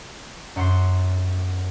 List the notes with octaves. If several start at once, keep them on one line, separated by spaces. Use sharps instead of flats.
F#2 F#5 C6 C7